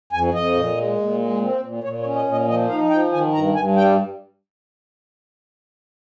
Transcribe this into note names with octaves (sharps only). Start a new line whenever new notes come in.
F2 G#5
F2 D#5
A#2
G#3
A#2
G#3
C4
A#2
A#2 C#5
C#5
C#4
D#5
A#2
D#5
F3 D#5
D#4 F5
F3 G5
D#3 G#5
G2 A#5
G2 G#5
G3 G5